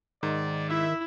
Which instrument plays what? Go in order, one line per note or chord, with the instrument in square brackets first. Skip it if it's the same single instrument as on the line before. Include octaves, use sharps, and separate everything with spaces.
[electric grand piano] G#2 [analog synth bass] D#3 [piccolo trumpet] D5
[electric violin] E4 [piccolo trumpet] E5